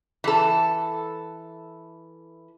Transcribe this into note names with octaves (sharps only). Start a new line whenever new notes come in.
E3 A4